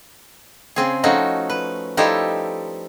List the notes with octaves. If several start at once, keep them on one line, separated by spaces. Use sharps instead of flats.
C#3 C4 G#4
F3 A3 C#4 D#4 F#4
B4
F3 G3 D#4 E4 G4 A4